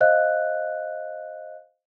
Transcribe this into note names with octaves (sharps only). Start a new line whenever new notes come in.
C5 D#5 F5 F#6